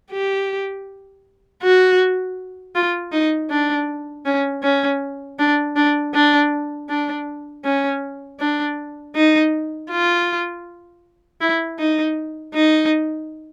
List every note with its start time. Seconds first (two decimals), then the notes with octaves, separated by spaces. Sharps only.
0.11 G4
1.62 F#4
2.75 F4
3.12 D#4
3.50 D4
4.25 C#4
4.63 C#4
5.39 D4
5.76 D4
6.14 D4
6.89 D4
7.64 C#4
8.40 D4
9.15 D#4
9.91 F4
11.41 E4
11.79 D#4
12.54 D#4